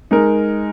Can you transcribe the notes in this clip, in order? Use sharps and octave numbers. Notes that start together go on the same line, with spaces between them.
G#3 D#4 A#4